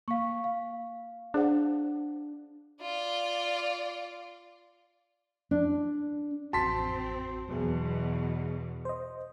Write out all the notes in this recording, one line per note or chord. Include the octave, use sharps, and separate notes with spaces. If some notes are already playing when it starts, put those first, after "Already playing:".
A#3 F5 C#6
F5
D4 G#4 C5 F#5
F4 D5
D4
A1 F2 C4 F#4 A5 C6 B6
E2 B2 F#3 B3 G#4
C5 D#5